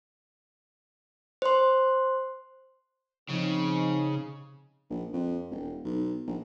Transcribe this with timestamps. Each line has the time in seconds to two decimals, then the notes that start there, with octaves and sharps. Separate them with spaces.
1.42 C5 C6
3.29 C#3 F3 C4 D#4
4.90 A#1
5.13 F2
5.51 E1
5.85 B1
6.27 A#1